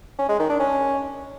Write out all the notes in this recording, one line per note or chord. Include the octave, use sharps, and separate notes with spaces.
C#4
G#3
D#3
D4
C#4